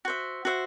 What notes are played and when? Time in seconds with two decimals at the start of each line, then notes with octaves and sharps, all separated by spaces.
0.05 F#4 C5 E5
0.45 F#4 C5 E5